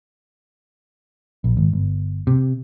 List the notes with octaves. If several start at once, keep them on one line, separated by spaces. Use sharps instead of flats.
A#1
G#1
G1
C3